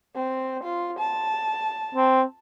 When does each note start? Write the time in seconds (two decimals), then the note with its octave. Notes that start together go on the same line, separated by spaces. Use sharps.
0.15 C4
0.63 F4
0.99 A5
1.95 C4